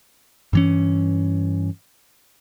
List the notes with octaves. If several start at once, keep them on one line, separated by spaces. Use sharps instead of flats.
G2 E3 C#4